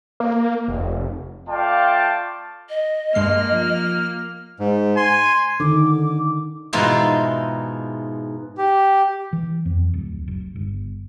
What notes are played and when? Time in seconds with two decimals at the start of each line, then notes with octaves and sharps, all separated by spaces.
0.20 A#3
0.68 F1
1.49 A3 F4 D5 F5 G5 A5
2.70 D#5
3.15 G2 G#3 A#3 F6 C7
3.51 F3
4.60 G#2
4.97 G#5 C6
5.60 D3 D#3 D6
6.73 G#2 B2 E3 G#3 D#4 F4
8.58 G4
9.33 E3
9.65 F2
9.94 D1
10.28 F#1
10.55 G1